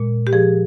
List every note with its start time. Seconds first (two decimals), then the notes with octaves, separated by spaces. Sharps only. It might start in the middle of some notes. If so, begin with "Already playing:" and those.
Already playing: A#2 G#3
0.27 G4
0.33 F3 G#4